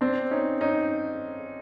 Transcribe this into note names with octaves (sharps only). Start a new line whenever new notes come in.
C4 D4
C#4 D#4
C#4 D#4